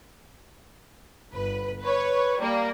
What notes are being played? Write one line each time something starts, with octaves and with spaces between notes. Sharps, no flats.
G1 B4
B4 C#5
G3 A#3